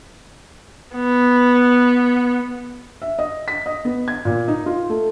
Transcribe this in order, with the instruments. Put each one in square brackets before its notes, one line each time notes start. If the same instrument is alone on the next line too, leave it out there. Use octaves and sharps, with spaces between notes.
[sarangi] B3
[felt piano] E5
D#5
B6
D#5
B3
G#6
A#2
D#4
F4
A3